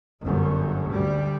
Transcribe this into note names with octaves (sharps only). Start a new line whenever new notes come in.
G1 F#2
D2 G3